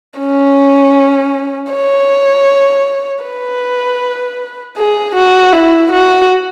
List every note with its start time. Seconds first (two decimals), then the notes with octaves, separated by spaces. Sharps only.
0.20 C#4
1.73 C#5
3.24 B4
4.77 G#4
5.16 F#4
5.53 E4
5.92 F#4